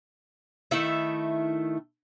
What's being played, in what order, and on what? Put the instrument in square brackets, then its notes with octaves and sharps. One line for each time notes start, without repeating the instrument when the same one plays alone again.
[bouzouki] D#3 A3 E4 E5